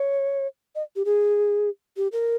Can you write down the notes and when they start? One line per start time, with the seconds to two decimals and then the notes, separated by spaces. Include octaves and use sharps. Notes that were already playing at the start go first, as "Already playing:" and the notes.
Already playing: C#5
0.75 D#5
0.96 G4
1.05 G#4
1.97 G4
2.12 A#4